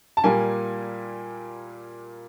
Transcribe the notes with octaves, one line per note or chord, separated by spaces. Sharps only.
A5
A#2 G3 A#3 G#5